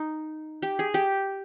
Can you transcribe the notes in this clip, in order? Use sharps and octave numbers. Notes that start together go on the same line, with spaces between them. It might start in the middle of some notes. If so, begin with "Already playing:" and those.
Already playing: D#4
G4
G#4
G4